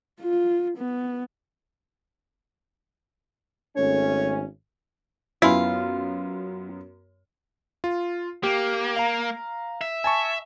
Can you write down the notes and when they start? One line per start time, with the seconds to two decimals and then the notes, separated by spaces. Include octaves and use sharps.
0.21 F4
0.78 B3
3.76 G#1 A3 C#4 C#5
5.42 F#2 B3 E4 F4 G#5 B5 C6
7.84 F4
8.43 A#3 G4
8.96 F5 A#5
9.81 E5
10.04 G#5 A5 C#6